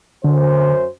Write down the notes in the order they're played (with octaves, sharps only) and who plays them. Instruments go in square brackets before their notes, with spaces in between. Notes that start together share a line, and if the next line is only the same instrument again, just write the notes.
[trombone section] F#2 C5 [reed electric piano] D3